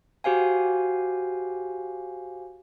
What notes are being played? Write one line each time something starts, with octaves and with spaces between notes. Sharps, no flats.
F#4 G4 C5 F5 G#5